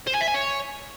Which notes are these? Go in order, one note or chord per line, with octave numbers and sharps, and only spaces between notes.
C5
G#5
E5
G#5
C#5